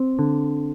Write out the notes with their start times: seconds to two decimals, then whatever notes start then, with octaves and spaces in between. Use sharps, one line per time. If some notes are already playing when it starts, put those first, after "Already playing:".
Already playing: C4
0.19 D3